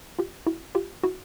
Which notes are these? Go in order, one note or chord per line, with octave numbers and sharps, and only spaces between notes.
F4 G4
E4 F#4
F4 G4
E4 F#4